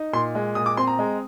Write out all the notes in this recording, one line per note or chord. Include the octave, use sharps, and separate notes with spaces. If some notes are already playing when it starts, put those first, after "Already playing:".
Already playing: D#4
A#2 C6
G#3
A#2 D#6
D6
C4 C6
A#5
G#3